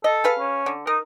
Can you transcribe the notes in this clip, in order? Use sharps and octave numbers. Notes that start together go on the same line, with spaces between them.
A4 D#5
G#4 B4 F5
C#4
D3
D#4 A#4